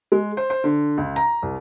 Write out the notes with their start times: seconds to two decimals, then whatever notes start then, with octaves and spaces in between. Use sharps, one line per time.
0.12 G#3
0.37 C5
0.50 C5
0.64 D3
0.97 C#2
1.16 A#5
1.42 C2